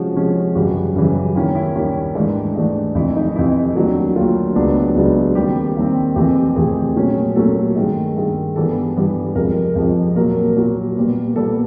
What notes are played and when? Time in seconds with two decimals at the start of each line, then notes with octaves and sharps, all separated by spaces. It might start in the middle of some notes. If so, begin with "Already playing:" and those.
Already playing: C3 F3 G#3 C#4 F#4
0.15 C3 F3 G#3 C#4
0.55 F#2 C#3 E3 G3 F#4
0.96 F#2 C#3 E3 G3
1.35 D#2 D#3 G3 A#3 C#4 E4
1.55 E4
1.75 D#2 D#3 G3 A#3 C#4
2.15 G#2 E3 A3 D4
2.56 G#2 E3 A3 D4
2.95 F2 C3 E3 E4
3.16 D#4
3.36 F2 C3 E3 E4
3.75 D#2 D3 F#3 A3
4.16 D#2 D3 F#3 A3 F4
4.56 C#2 C#3 F#3 B3 D4
4.96 C#2 C#3 F#3 B3 D4
5.35 D#2 D#3 G3 C4 G4
5.75 D#2 D#3 G3 C4
6.16 F2 C3 E3 A3 C4 G4
6.56 F2 C3 E3 A3 C4 G#4
6.96 A#2 F#3 A3 C#4
7.35 A#2 F#3 A3 C#4 A4
7.76 G2 D#3 G#3
8.16 G2 D#3 G#3
8.56 G2 E3 G3 B3 A4
8.97 G2 E3 G3 B3
9.35 F2 C3 F3 G#3 A#4
9.75 F2 C3 F3 G#3
10.16 A#2 F#3 A#3 A#4
10.57 A#2 F#3 A#3
10.96 A#2 G3 B3
11.36 A#2 G3 B3 A4